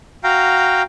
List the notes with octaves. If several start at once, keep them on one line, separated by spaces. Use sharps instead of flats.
F#4 F5 G5 A#5